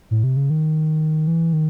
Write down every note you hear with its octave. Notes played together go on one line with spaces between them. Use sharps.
A2
C3
C#3
D#3
E3
D#3